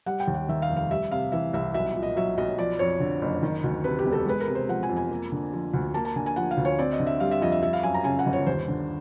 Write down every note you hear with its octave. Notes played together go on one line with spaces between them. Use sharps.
G3 F#5
G5
D#2
F#5
D#3 E5
F5
F1
F5
G3 E5
C3 F5
E3 E5
C2 E5
B1 E5
A#2
D#5
F#3 E5
B1 D#5
F3 D5
F2 C#5
D3
F#1
D#3
D2
C3 B4
G4
E1
A4
G#3 B4
A#4
C3
C5
F3 F#5
G#5
F2
G#5
A#3
D3
F3
D2
A#3 A5
A5
D3 G#5
G#5
F3 F#5
F5
D2
C#5
C4 D5
D#5
D3
E5
G3 F5
E5
F2 D#5
E5
F3 E5
F5
F#2 G#5
A#5
C#3 G#5
F#5
G1
C#5
D#2 C5
D3